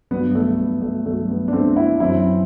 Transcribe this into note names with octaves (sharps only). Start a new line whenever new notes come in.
G2 F#3 B3
A3
B3
A3
G2 F#3 A3
B3
D4
A3 C4
C4 E4
F#2 E3 C4 E4